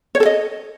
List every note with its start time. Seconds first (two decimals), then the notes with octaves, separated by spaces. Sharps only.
0.15 C#5
0.20 A4
0.26 D#5